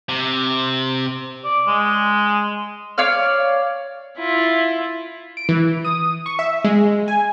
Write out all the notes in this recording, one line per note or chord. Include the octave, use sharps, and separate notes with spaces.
C3
D5
G#3
C#5 D5 F5 F6
E4 F4
D7
E3
D#6
C#6
E5
G#3
G#5